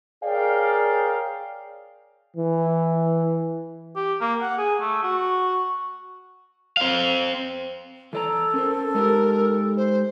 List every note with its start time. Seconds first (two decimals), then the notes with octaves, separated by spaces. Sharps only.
0.24 G#4 A#4 C#5 D5 F5 G5
2.36 E3
3.96 G4
4.21 A#3
4.42 F#5
4.58 G#4
4.81 A3
5.03 F#4
6.77 C4 F5
8.13 E3 A4 D5 A#5
8.54 C#4 A#4 C5
8.95 G#3 D#4 G4 A#4
9.77 C5